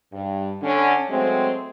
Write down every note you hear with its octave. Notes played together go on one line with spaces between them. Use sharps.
G2
D3 C#4
F#3 G#3 A3 C4